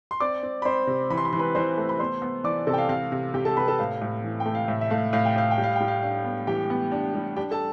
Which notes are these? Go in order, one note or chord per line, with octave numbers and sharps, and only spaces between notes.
C6
C4 D5 D6
C4
B5
C4 C5 C6
C3
E3 B5
C6
B5
E3 C6
B4 B5
E3 C5 C6
A3
B5
B3 C5 C6
B3
E3 D5 D6
C3 A4 A5
G5
F5
C3 F5
C3
C3 G4 G5
A4 A5
C3 B4 B5
A4 A5
A2 F5
A2
E3
G5
A3
F5
A2 E5
E5
A3 F5
A2 F5
G5
A2 F5
G5
G3
F5
G3 G5
F5
D4 F5
B3
E3 G4 G5
B3
D4
G3
D4 G4 G5
A4 A5